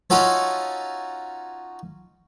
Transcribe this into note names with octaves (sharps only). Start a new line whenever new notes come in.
C#4 D#4 F4 F#4 A4 C#5